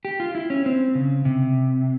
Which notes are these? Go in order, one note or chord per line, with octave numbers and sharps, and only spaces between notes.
G4
F4
E4
C#4
C4
C#3
C3